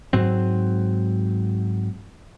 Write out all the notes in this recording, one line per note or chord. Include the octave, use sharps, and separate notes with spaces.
G#2 F#3 C4